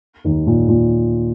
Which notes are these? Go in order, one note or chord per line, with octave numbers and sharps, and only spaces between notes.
D#2 D#3
A#2
A#2